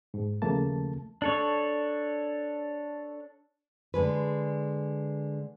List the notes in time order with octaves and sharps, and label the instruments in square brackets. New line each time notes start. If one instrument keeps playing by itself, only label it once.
[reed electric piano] G#2
D#2 C#3 F3 A3 A#3 A5
[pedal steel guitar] D4 A4 C#5
[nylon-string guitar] D3 G#3 B4